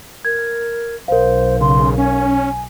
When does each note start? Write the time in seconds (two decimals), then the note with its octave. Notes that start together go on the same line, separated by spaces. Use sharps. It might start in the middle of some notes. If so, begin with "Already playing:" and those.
0.25 A#4 G#6
1.08 B1 A#4 C5 F5
1.61 C#3 C6
1.98 C#4 G#5